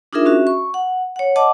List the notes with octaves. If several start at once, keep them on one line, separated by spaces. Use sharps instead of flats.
D4 D#4 F4 G#4 A#4 E5
C#4 F#4 E5
C#6
F#5
C#5 F#5
D#5 F#5 A5 D6